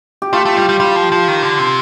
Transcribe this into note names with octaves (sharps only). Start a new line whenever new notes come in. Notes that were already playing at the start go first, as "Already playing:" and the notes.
G4
A3 F4
A3
G3 F4
G3
G3 F4
F3
F3
D#3
D3
C3